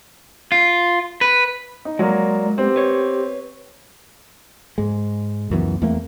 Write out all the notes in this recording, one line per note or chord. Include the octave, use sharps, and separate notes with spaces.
F4
B4
D#4
F#3 G#3 A#3 D5
B3 C4 G4
B4 C#5
G#2 G#3
C#2 F#2 E3 B3
E2 A3 A#3 C4